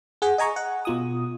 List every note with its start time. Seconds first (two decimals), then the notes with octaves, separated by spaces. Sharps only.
0.22 G#4 F#5 G#5
0.38 D#5 G#5 A#5 C#6
0.56 F#5
0.85 B2 F4 D#6